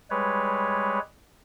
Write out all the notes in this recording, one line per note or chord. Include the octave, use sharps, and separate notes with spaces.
G3 G#3 B4 C#5